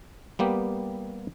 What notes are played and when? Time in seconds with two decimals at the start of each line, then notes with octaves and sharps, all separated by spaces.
0.39 G3 A#3 B3 G4